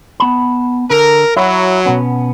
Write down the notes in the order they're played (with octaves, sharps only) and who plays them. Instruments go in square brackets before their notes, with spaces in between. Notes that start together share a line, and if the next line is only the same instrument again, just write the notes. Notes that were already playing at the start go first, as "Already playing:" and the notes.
[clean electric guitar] B3 A5 B5
[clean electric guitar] D3 A4 [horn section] A#4
[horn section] F#3 [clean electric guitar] E4
[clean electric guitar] B2 B3 C#4